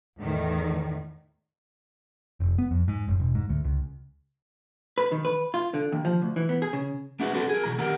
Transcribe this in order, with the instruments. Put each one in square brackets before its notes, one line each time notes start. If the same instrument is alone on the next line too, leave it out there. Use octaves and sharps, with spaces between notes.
[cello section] E2 A2 D#3
[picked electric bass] F1
B3
F2
G#2
F#1
E1
G#2
D2
C#2
[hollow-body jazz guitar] B4
D#3
B4
F4
D3
D#2
F3
D2
E3
B3
G#4
C#3
[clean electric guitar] B3 D4 E4 F#4 G#4 B4
F#3 C4 D4 F#4 A4 B4
G#4 A#4
B1 F#2 B2 E3 A#5
D#3 B3 G4 A#4 F#5 A#5